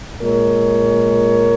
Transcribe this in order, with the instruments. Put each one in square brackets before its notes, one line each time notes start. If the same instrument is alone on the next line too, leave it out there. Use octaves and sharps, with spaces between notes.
[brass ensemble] A#2 G#3 A#4 C#5